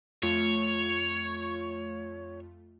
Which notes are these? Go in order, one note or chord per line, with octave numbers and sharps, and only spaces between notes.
F2 A3 F4 C#5